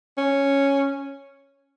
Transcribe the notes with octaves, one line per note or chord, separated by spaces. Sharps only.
C#4